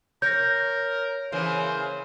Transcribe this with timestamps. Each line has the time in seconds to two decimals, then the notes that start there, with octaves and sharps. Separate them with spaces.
0.22 A#4 C#5 G6 A#6
1.32 C#3 E3 A#3 C5